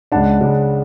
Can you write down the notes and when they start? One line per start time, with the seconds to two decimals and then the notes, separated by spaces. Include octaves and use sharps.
0.12 C#2 C#3 G#3 D4 F#5 A5
0.41 C#2 C#3 G#3 D4